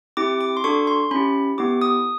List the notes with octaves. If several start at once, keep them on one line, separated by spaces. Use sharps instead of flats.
C4 E4 G4 D6
D6
C6
D4 F#4 A4 C#6
C6
C#4 E4 G4 B5
B3 E4 G4 D6
D#6